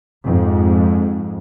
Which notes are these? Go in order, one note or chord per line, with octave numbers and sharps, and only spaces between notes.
F2 G#2